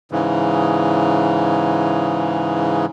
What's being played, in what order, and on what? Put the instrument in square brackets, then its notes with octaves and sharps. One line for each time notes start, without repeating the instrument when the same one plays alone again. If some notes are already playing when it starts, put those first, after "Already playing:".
[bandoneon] G#2 C#3 E3